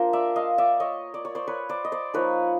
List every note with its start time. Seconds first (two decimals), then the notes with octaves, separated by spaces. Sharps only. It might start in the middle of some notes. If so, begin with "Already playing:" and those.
Already playing: A#3 D4 F4 A#4 C5
0.13 D5 E5
0.36 D#5 F5
0.58 D5 E5
0.80 C#5 D#5
1.14 D5
1.25 C#5
1.35 C5 D5
1.47 B4 C#5
1.69 C5 D5
1.85 D#5
1.92 C5 D5
2.14 F3 A#3 D#4 B4 C#5